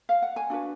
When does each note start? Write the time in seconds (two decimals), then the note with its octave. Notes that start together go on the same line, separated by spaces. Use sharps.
0.09 F5
0.22 F#5
0.36 G#5
0.50 D4 F#4 B4